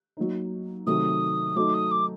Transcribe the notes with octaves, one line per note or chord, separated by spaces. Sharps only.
F#3 A#3 D#4
C3 D#3 F#3 A3 D#6
F#3 A3 D#4 D6
D#6
D6